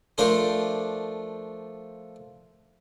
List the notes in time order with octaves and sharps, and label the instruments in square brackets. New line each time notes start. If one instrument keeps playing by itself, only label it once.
[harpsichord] F3 A3 D4 A#4 C5